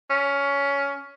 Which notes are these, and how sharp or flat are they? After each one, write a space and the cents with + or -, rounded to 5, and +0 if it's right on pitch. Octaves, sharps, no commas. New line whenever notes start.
C#4 +15